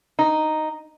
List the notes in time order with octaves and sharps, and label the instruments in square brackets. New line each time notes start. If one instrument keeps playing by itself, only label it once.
[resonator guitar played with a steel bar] D#4